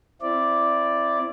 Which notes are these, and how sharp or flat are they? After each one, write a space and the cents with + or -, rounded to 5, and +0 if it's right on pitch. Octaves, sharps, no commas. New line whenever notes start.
C4 +0 E4 +20 D5 +0